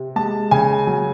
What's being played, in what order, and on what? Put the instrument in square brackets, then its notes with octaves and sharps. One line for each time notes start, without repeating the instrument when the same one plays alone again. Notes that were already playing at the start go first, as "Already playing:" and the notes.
Already playing: [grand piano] C3
G#3 A5
C#3 G#5
F#3